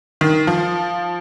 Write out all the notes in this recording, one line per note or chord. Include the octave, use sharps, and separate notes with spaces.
D#3
F3